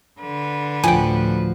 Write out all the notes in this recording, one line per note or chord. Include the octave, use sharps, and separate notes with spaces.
D3 B4
D2 A2 F3 F#4 G5 G#5